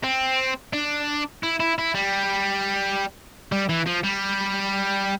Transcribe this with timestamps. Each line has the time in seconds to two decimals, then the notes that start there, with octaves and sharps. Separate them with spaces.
0.04 C4
0.73 D4
1.43 E4
1.60 E4
1.79 E4
1.95 G3
3.52 G3
3.69 E3
3.86 F3
4.04 G3